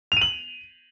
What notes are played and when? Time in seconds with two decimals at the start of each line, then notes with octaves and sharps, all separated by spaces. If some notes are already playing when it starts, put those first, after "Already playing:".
0.12 F7
0.17 D#7
0.21 F#7